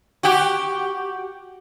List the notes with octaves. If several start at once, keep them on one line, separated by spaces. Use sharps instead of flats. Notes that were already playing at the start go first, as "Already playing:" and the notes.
F#4 G4